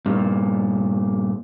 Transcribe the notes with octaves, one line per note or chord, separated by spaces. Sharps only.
G2 A#2